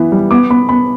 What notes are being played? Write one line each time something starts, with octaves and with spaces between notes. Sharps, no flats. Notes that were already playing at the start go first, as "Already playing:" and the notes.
Already playing: E3 B3
G3
B3 D6
B3 B5
B3 B5